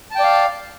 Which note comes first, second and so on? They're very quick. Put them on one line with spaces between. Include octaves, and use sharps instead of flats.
A5 G5 D5 F5